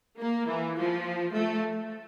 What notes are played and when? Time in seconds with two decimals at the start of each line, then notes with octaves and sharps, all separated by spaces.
0.20 A#3
0.48 E3
0.76 F3
1.33 A3